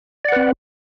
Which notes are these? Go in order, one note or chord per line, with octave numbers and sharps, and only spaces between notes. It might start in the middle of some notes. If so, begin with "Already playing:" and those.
C4 B4 D5 F#5